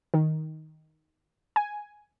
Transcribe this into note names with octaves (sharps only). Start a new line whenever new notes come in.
D#3
G#5